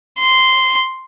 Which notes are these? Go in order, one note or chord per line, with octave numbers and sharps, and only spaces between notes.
C6